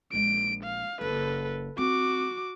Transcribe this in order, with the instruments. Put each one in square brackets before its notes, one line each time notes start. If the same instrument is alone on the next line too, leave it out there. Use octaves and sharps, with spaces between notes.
[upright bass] A#1 G#3 [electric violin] D7
[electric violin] F5
[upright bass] F#1 [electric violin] A4 B4
[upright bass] C4 [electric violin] F#4 D6